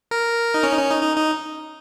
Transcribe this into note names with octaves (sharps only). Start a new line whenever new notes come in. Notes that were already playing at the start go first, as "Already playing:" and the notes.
A#4
D#4
C#4
D#4
C#4
D#4
D#4
D#4